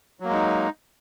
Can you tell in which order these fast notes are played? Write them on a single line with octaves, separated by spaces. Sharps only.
F#3 A#3 G#3 D#4